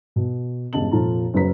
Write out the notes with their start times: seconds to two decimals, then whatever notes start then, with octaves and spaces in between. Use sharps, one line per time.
0.16 B2
0.73 E1 G2 C#3 D#5 A5 F#7
0.91 F1 A#2 F4 A4 A5 A#5
1.34 F#1 F#3 B4 A#5 B6